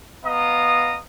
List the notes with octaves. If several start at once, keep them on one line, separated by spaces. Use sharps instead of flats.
B3 D#5 F5 A#5 D#6